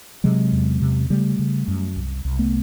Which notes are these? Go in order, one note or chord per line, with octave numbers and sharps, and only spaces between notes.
C3 F#3 G#3
E2
C3
C#3 G3 A3
C#3
F#2
C2
C2
A3 B3